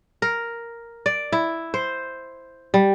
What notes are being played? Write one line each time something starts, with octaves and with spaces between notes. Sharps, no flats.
A#4
D5
E4
C5
G3